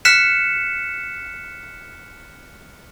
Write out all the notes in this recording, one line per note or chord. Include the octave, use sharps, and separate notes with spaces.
F6 F#6 B6 C#7 E7